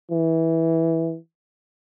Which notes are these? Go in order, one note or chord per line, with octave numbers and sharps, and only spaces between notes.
E3